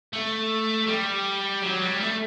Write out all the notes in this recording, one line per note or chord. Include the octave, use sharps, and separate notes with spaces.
A3
G3
F#3
G3
A3